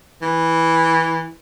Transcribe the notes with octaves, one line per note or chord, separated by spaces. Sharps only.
E3